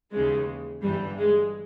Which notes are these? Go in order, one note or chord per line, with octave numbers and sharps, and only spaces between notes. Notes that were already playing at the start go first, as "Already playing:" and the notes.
D#2 C#3 E3 G#3
G1 G2 E3 G3
G#3